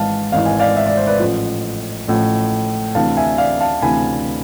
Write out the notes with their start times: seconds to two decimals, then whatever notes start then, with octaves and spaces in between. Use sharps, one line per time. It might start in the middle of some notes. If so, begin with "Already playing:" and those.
Already playing: G#1 G#2 E3 F5 A5
0.32 G#1 G#2 E3 F5
0.46 G#5
0.60 D5 F5
0.76 E5
0.87 D5
0.97 C5
1.07 B4 D5
1.20 A1 A2 F3
2.08 A1 A2 F3
2.95 D2 C3 E3 F5 A5
3.17 E5 G#5
3.38 D5 F5
3.61 F5 A5
3.82 D2 C3 E3 G#5 B5